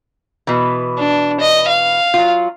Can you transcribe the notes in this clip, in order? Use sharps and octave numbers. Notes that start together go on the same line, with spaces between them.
B2 E3
D4
D#5
F5
F#3 F4